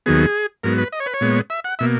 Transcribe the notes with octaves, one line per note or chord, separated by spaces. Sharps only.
D#2 D#3 F#3 B3 G#4
G#2 F#3 B3 A#4
B4
D#5
C#5
B4
C#5
A#2 G#3 B3
E5
F#5
B2 A#3 E5